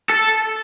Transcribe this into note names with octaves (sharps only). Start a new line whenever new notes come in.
A4